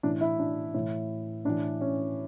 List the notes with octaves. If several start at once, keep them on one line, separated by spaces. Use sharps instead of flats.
A2 E3 D4
E4
D4
A2 E3
A2 E3 D4
C#4